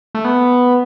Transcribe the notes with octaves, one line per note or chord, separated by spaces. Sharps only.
A3
B3